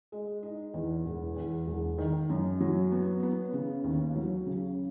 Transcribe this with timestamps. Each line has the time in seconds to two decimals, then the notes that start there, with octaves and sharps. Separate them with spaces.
0.12 G#3
0.43 D#4
0.74 E2
1.05 E1
1.36 E2
1.67 E1
1.98 D#3
2.30 F#2
2.60 F#3
2.92 B3
3.23 B3
3.53 C#3
3.84 D#2
4.15 F#3
4.47 C#3